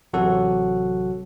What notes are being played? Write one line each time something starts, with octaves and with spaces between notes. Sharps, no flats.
A1 C3 F#3 F#4 A4 F#5